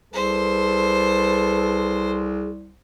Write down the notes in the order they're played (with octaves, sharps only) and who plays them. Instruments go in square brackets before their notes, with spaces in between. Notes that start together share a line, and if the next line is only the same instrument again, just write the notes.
[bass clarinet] C2 [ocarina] G#4 [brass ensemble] A4 B4 [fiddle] C5